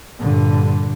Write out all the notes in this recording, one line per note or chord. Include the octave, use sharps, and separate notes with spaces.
G2 A#2 D3